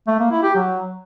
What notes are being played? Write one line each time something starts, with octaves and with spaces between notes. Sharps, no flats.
A3
A#3
E4
G4
F#3